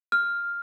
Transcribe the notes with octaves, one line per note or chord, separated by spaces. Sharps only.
F6